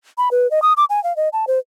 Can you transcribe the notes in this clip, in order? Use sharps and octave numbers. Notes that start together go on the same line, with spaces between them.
B5
B4
D#5
D#6
D6
G#5
F5
D#5
A5
C5